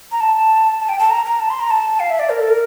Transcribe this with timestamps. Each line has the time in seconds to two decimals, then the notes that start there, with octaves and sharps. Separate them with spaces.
0.12 A#5
0.20 A5
0.80 A5
0.89 G5
0.99 A5
1.10 A#5
1.25 A#5
1.40 A5
1.50 C6
1.60 A#5
1.70 A5
2.00 F5
2.10 E5
2.19 D5
2.30 A#4
2.40 A4
2.50 A#4